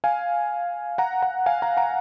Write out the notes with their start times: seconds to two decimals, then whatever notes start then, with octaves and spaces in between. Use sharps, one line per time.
0.04 F5 G#5
0.98 F#5 A#5
1.22 F#5 A#5
1.46 F5 G#5
1.62 F#5 A#5
1.77 F#5 A#5